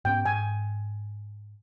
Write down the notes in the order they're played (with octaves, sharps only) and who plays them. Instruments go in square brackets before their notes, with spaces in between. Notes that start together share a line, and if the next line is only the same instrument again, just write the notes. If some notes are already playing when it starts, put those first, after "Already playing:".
[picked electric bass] G#2 B3 C#4 [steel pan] G5
[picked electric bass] G#2 [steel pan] G#5